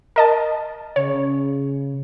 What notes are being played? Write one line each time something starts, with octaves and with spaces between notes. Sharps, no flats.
A#4 D#5 A5
C#3 C#5